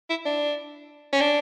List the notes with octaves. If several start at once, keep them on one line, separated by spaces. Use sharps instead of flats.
E4
D4
C#4
D4